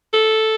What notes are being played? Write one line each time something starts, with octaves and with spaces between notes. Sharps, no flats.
A4